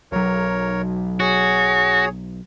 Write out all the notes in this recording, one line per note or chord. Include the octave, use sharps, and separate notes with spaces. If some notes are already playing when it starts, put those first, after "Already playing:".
B1 F#3 A#4 C#5
F#4 G#4 C#5